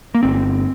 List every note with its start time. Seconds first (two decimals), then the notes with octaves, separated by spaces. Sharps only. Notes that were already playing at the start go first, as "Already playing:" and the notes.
0.15 A#3
0.23 G1 C4